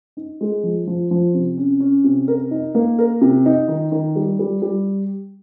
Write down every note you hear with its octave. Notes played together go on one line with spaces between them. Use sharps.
D#4
G#3
F3
F3
F3
C3
C#4
C#4
C3
A#4
D#4
A#3
A#4
C3
D#4
D#3
D#3
G3
G3
G3